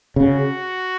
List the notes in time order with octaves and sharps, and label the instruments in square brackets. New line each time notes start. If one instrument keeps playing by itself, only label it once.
[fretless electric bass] C#3 [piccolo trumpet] F#4